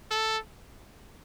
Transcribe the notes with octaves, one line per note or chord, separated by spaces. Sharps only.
A4